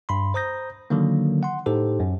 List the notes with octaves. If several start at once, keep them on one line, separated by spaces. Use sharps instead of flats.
G2 B5 C6
C5 A#5 D#6 G6 A#6
D3 D#3 F#3 A#3
F#5 C6
A2 D#4 G4 A4 C5
F#2